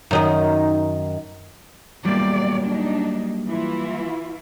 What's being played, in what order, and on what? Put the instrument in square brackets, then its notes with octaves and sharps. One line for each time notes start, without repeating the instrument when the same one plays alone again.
[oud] F#2 D#3 D#5
[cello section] E2 A#2 D5 [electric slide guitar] F#3 G3 A#3
[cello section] D4 D#4
E3 E4 F4